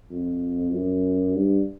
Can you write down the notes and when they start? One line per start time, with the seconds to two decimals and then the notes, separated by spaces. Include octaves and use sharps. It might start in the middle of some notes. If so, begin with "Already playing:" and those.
0.10 F2
0.73 F#2
1.35 G2